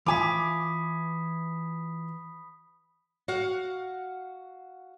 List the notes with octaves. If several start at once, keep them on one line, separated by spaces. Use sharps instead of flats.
E3 F4 E5 G#5 B5 D6 D#6 B6
F#4 F5 F#5